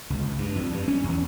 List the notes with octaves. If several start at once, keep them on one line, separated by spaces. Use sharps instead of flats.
C#2
G2
F2
G2
C#4
E2